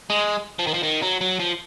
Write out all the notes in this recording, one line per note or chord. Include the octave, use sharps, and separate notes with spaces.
G#3
F3
D#3
F3
D#3
F#3
F#3
F3